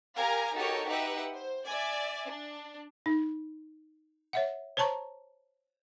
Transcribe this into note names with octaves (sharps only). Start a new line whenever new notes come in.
G4 A#4 F5 G#5 A#5
D#4 F#4 G4 A4 A#4 C#5
D#4 G4 B4 E5 F#5
C5
D5 E5 G#5
D4
D#4
C#5 E5 F#5
C5 C#5 A5 A#5 C#6